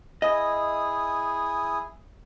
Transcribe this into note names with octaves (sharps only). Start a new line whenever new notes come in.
E4 G#4 D#5 D#6